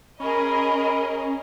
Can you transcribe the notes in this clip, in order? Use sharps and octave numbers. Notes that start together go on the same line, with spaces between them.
C#4 G#4 A#4 D#5 B5